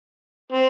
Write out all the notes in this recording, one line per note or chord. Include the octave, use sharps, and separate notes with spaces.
C4